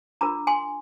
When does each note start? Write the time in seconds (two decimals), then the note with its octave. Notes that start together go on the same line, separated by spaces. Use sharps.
0.21 D4 F4 A#4 A#5 D6
0.47 G#5 C6